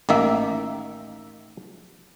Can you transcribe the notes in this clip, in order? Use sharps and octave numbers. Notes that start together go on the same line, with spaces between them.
A1 D#3 A#3 E5